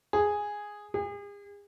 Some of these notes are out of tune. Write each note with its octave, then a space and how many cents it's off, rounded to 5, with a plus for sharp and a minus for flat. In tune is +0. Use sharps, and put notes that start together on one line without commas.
G#4 -5
G#4 -40